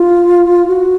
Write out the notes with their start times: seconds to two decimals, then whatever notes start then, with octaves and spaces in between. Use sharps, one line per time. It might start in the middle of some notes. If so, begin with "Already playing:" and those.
Already playing: F4
0.68 F#4